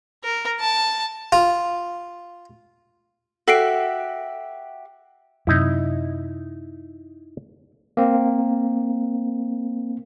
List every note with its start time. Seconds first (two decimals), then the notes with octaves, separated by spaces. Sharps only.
0.24 A#4
0.60 A5
1.32 F4
3.48 F#4 G4 A4 E5 C7 D7
5.47 F#2 C3 D#4 E4
7.97 A#3 C4